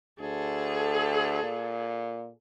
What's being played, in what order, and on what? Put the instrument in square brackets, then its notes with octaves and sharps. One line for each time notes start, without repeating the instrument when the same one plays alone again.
[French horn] D2 [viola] G#4 A4
[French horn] A#2